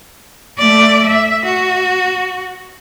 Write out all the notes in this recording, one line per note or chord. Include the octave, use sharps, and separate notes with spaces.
A3 D5
E5
F#4